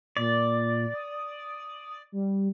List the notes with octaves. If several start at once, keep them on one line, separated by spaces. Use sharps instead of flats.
A#2 D5
D#6
G3